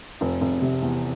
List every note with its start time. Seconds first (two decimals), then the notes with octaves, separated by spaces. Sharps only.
0.21 F1
0.41 F1
0.62 C3
0.82 E2